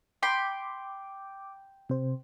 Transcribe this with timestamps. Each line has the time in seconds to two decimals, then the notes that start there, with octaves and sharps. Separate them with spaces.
0.23 G5 B5 C6 D6
1.89 C3 C5